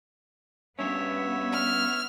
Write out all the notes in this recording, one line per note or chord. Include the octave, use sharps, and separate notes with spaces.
G2 B3 C#4 C#5 E5
F6